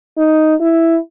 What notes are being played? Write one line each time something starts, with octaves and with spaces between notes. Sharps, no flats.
D#4
E4